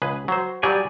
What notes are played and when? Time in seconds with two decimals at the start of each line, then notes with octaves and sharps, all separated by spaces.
0.02 C#2 G#4 B4
0.28 F#3 C5
0.63 F#3 G3 G4 G#4 D5 G#5